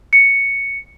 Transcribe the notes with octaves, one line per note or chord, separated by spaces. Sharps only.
C#7